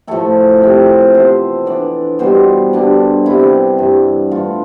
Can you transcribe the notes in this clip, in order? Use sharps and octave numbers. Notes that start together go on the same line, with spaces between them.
A2 F3 A3 E4 A4
C3 F3 C4 E4
C3 E3 B3 E4 C5
E3 B3 D4 D5
B2 G3 B3 C5
D3 G3 D4
C3 G3 B3 E4
G2 E3 B3
A2 E3 A3 D4 F4